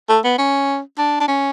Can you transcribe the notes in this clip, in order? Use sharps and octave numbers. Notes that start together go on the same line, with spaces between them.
A3
B3
C#4
D4
D4
C#4